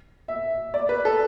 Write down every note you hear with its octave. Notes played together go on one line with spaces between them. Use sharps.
E5
D5
B4
A4